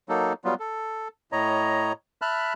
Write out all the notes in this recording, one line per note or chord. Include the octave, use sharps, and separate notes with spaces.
F#3 A#3 D#4 A4
F#3 G3 B3 F4
A4
A2 C#5 D#5 A#5
E5 A5 B5 F6 F#6